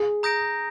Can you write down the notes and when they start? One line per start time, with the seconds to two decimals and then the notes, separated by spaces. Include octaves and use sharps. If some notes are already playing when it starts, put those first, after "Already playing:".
Already playing: G#4
0.23 A#5 D#6 G6 A#6 D7